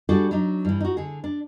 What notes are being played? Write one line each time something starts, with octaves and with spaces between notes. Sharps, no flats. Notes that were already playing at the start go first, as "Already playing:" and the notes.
G3 D4 F#4 G#4 A4
F#3 D4 D#4
G2 E3
D#4 F#4
D3 G#4
D4